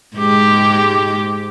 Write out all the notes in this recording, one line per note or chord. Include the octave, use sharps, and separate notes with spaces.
G#2 G#3 G4